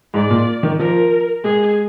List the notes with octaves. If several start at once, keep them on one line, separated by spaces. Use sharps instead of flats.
G#2 D5
A#2
D#3
F3 A#4
G#3 G#4